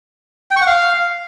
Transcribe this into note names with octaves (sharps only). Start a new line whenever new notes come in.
G5
C#6
F#5
F5